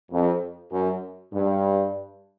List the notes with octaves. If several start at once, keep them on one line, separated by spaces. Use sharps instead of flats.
F2
F#2
G2